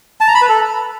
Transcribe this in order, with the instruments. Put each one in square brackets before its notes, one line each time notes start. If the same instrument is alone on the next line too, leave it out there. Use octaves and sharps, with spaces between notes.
[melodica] A5
A#5
B5
B4
A4